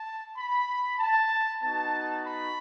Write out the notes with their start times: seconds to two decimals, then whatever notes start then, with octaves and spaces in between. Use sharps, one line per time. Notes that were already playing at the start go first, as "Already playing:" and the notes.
Already playing: A5
0.38 B5
0.99 A5
1.62 B3 D#4 F#4 A5
2.24 B5